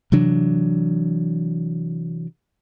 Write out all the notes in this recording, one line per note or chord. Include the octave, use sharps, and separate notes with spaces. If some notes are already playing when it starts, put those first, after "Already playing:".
C3 E3 F#3 D4